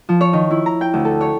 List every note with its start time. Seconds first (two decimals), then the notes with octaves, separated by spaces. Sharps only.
0.09 F3
0.21 C#5
0.33 D#3
0.51 E4
0.66 A#5
0.81 G5
0.94 D2
1.05 A4
1.21 C#5